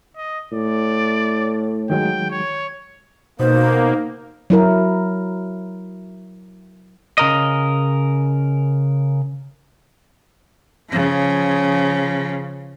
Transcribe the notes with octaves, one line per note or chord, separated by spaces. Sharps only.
D#5
A2 D5
D#3 F#3 G#3 G5
C#5
B2 A#3 D#4 C5
F#3 E4 A#4
C#3 A#4 D#5
C#3 F3